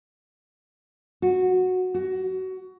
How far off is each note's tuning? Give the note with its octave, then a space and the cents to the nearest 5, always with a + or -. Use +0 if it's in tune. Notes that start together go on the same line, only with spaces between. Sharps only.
F#4 -10
F#4 +20